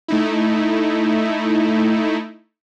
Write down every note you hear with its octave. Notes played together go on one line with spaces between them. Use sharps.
A3 D#4 E4